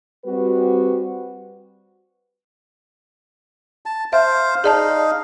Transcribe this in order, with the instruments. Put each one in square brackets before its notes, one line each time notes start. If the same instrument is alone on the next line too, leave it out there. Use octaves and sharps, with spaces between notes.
[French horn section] G3 C4 F#4 B4
[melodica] A5
[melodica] C5 F5 [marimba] E5
[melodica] D#4 F5 [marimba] G#4 D5 A5